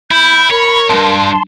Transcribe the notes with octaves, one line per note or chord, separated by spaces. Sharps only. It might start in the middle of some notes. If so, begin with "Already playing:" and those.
E4 B5 G6
A#4 C#5
B1 G2 A5 C6